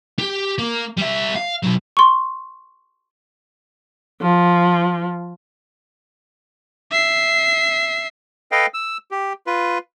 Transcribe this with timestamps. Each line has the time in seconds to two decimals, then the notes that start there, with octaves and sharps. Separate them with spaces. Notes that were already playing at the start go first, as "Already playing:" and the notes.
0.19 G4
0.58 A#3
0.98 G3 E5
1.35 F5
1.63 B2 F#3
1.97 C6 C#6
4.21 F3
6.91 E5 C7
8.52 A4 B4 D#5 F5 G5
8.74 E6
9.11 G4
9.47 F4 B4